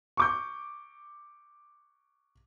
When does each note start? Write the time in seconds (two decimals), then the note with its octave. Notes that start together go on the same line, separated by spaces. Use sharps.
0.17 C#6 D6 G6